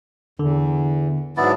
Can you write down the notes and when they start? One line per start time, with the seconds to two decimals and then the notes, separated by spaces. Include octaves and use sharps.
0.39 E2 D3
1.37 G#2 F#3 B3 D4 E4 D5